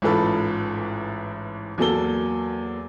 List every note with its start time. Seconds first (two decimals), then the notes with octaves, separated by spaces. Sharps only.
0.02 A1 G#2 E3 F4 A4 B5
1.78 E2 F#3 A#3 A4 G7